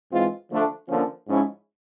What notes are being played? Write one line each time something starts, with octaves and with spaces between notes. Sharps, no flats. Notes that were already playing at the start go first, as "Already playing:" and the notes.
G#2 E3 G#3 C4 F4
D3 F3 A3 D4
D3 F3 A#3 C#4
G#2 F3 G#3 C#4 E4